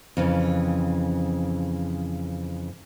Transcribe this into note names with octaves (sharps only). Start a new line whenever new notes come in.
F2 C#3 E3